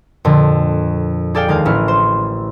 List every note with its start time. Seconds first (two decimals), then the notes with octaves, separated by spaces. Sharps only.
0.25 F2 A#2 D3
1.35 G#4 A4 D5 F5 G5
1.48 D#2 G#3 G#4 F5
1.65 A1 C#4 E4 C#6 F6
1.88 C5